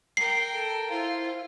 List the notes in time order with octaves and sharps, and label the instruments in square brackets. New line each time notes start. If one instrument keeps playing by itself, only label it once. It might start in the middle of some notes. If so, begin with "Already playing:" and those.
[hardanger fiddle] A#4 G5 [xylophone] C7
[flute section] A4 A5
[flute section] E4 C5 F5 [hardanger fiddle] F4